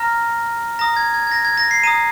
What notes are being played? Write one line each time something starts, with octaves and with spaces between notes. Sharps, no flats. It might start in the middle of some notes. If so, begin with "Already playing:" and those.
Already playing: A#5 F6 A#6
A#5 D#6 A#6
G#6
G#6
G#6
A#6
G#6
A#6
C7
A#5 D#6 D#7